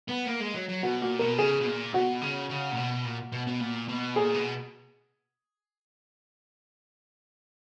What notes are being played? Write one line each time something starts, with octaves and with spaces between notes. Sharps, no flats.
B3
A#3
G#3
F#3
F#3
B2 F#4
A#2 F#4
B2 A#4
C#3 G#4
B2
A#2
B2 F#4
C#3
C#3
A#2
B2
A#2
B2
B2
A#2
B2
A#2 G#4
B2